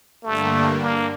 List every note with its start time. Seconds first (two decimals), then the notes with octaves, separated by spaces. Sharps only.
0.24 G2 D3 G3 A3 A#3 D4
0.81 A#3